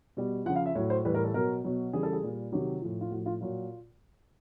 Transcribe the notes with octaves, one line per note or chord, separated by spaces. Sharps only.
B2 G3
C#3 F3 F#5
F5
E5
A2 F#3 C#5
C5
A2 E3 G3 B4
A#4
A4
B2 F#3 A#4
B2 F#3
C#3 E3 G3 G#4
A4
G#4
A#2 G3
C3 D#3 F#3 G4
A2 F3
F4
A2 F3 F#4
F4
A#2 F#3 F4